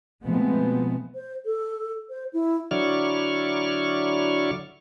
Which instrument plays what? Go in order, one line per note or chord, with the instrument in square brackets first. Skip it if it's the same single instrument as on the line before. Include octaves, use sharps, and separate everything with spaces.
[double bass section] B2 F3 G#3 A3 B3 C4
[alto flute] C5
A4
C5
E4
[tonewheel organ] D3 F#3 E4 D5 C#6 F6